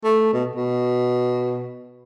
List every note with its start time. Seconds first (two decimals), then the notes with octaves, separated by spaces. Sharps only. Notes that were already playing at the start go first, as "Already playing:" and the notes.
0.04 A3
0.33 B2
0.56 B2